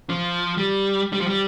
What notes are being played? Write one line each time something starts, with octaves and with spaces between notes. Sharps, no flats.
F3
G3
G3
F3
G3